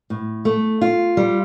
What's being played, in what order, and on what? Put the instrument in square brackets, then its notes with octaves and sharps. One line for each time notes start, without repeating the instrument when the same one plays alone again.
[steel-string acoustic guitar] A2
A3
F4
G3